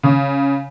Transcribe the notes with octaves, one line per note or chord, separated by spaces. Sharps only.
C#3